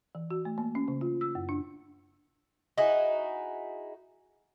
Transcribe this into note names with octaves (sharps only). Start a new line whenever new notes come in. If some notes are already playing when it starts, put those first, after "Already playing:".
E3
F#4
A3
A#3
C#4
C#3
F4
E6
F#2
D4
D#4 E4 F#4 G#4